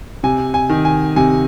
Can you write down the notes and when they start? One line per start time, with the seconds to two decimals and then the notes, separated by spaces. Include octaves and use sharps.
0.23 C3 G#5
0.54 G#5
0.69 D#3
0.85 G#5
1.16 C3 G#5